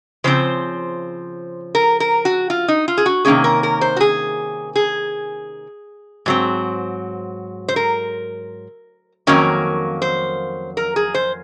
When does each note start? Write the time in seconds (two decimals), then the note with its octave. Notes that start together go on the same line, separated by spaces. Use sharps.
0.24 C#3 F3 C4 C5
1.75 A#4
2.00 A#4
2.25 F#4
2.50 F4
2.68 D#4
2.88 F4
2.97 G#4
3.06 F#4
3.25 C3 D#3 A#3 C#4 G#4
3.44 A#4
3.63 A#4
3.81 C5
3.97 F#4
4.00 G#4
4.76 G#4
6.26 G#2 F#3 C4
7.68 C5
7.76 A#4
9.27 F2 D#3 F#3 A#3 C#4 A#4
10.02 C5
10.77 A#4
10.96 G#4
11.14 C5